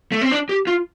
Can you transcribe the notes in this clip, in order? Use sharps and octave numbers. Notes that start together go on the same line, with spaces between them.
A3
C4
D4
G4
F4